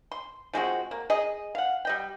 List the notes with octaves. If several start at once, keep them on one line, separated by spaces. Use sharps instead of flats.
C6
F3 G#3 C4 F#4
A#3
G#4 D#5
F5 F#5
G3 D#5 G5